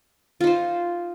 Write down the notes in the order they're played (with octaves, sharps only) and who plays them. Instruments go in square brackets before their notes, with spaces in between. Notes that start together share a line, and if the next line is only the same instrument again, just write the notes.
[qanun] F4
D#4
C5